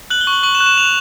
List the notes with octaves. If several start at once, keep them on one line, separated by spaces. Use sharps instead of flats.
F#6 F#7
G7
C#6
F#7
C#6 F#7
E7
F#6
E7
F#6 F7